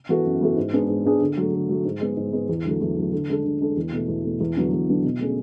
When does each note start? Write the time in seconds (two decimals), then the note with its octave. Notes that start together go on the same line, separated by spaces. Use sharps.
0.09 E3 B3 F#4 A4
0.25 F#2
0.41 E3 B3 F#4 A4
0.57 G#2
0.73 G#3 B3 D4 G#4
0.89 G#2
1.05 G#3 B3 D4 G#4
1.21 D3
1.37 F#3 A3
1.53 D3
1.69 F#3 A3
1.85 G#2
2.01 G#3 B3
2.17 G#2
2.33 G#3 B3
2.49 E2
2.65 D3 F#3 A3
2.81 E2
2.96 D3 F#3 A3
3.12 D3
3.29 G#3 D4 A4
3.45 D3
3.60 G#3 D4 A4
3.77 E2
3.92 B2 A3
4.08 E2
4.25 B2 A3
4.40 E2
4.56 D3 F#3 B3 D4
4.73 E2
4.88 D3 F#3 B3 D4
5.04 B2
5.20 A3 C#4 G#4